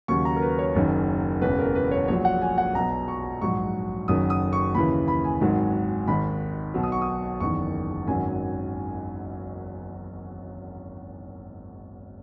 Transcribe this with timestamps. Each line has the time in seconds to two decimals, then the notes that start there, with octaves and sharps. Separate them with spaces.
0.08 D#2 C#3 F#3 C#6
0.25 A#5
0.36 A#4
0.42 B4
0.59 C#5
0.75 F#1 F#2 D#3
1.41 E1 E2 C#3 B4
1.58 A#4
1.75 B4
1.91 C#5
2.08 A#1 A#2 F#3 C#5
2.25 F#5
2.42 G#5
2.58 F#5
2.75 B1 B2 F#3 A#5
3.08 C#6
3.41 A#1 G#2 F#3 C#6
4.08 F#1 F#2 D#3 F#3 D#6
4.30 D#6
4.53 C#6
4.74 D#2 C#3 E3 B5
5.08 B5
5.24 G#5
5.41 G#1 G#2 D#3 F#3
6.07 G#1 G#2 D#3 B5
6.74 B1 B2 F#3
6.83 D#6
6.92 C#6
7.02 D#6
7.40 F#1 E2 D#3 C#6
8.07 G#1 F#2 D#3 F#3 G#5